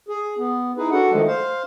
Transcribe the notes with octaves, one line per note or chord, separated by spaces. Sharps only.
G#4
B3
D#4 E4 G#4 B4
D4 F#4 A4 F#5
D3 D#3 F3 G#3 A3
C5 F5